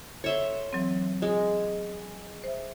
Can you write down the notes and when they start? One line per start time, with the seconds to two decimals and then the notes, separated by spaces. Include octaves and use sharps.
0.24 A4 C#5 E5 C6
0.73 E3 F#3 C4
1.22 G#3
2.44 C5 E5